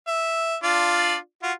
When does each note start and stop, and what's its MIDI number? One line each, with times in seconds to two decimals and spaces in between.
0.08 0.56 76
0.63 1.16 62
0.63 1.16 65
0.63 1.16 74
1.43 1.52 65
1.43 1.52 66